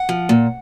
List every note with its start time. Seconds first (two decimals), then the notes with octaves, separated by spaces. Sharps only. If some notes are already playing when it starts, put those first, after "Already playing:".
Already playing: F#5
0.09 F3
0.29 A#2